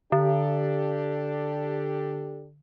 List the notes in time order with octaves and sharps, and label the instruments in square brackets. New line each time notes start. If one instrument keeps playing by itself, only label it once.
[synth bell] D3 [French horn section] D4 G4 A4